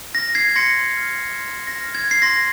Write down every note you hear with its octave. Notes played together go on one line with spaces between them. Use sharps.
F6 A#6
G#6 C7
C6 A#6 C#7
F6
C6
A#6
F6
G#6
C7
C6 A#6